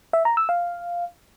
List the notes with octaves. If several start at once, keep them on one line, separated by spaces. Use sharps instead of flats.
E5
A#5
E6
F5